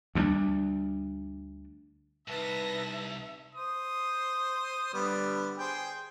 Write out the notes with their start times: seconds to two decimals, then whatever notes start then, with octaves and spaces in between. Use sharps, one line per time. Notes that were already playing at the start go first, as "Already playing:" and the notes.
0.15 D2 G3 A#3 D4
2.28 C2 D#4 B4 E5 A5 A#6
3.55 C5 D#6
4.94 D3 G3 B3
5.58 G#4 C5 G5